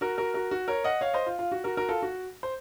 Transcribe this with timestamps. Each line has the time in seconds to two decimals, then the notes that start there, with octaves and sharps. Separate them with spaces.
0.01 F#4 A#4
0.18 F#4 A#4
0.34 F#4 A#4
0.51 F#4
0.68 A#4 C#5
0.84 D#5 F#5
1.01 C#5 F5
1.14 C5 D#5
1.27 F4
1.39 F4
1.52 F#4
1.64 F#4 A#4
1.77 F#4 A#4
1.89 F4 A4
2.02 F#4
2.43 C5